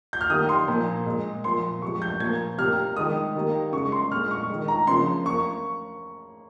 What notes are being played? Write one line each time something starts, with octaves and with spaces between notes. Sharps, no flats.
G6
F6
D#3 G3 A#3 D#6
C6
A#2 F3 A#3
A#2 G#3
A#2 F3 A#3 C6
C3 F3 G#3 C#6
G6
A#2 F3 A#3 G#6
C3 G3 A#3 F6
D#3 G#3 D#6
D#3 G3 A#3
C#3 G#3 C#6
C6
A#2 G#3 F6
C#6
D#3 G#3
A#5
C#3 F3 A#3 C6
A#3 C#6